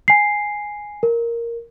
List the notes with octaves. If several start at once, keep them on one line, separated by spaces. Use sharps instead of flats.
G#5 C7
A#4